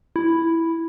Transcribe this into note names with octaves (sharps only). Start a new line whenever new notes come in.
E4